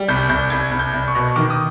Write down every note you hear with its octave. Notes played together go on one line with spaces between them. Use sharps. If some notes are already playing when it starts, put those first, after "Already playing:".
Already playing: G3
C2 G6
C2 G6
C2 G#6
C2
G6
C2
C#6
B2
D#3 D6
D#6